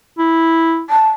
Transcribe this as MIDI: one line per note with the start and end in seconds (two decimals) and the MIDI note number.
0.18 0.82 64
0.90 1.11 81